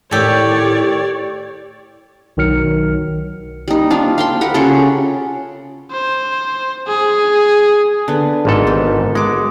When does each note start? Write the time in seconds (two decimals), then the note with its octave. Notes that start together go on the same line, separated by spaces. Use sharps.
0.11 A2 D#3 G4 A4 C#5 D5
2.37 B1 D#3 F#3 F6 C#7
3.68 G3 D#4
3.90 F3 D4 F4
4.18 F5 G5 C6
4.41 A#4 F#5 B5
4.54 C#3 F4 G4 A4
5.92 C5
6.88 G#4
8.08 D3 B3 B4
8.45 G#1 G#2 A4
8.67 B3 G4
9.15 G#3 F#4 D6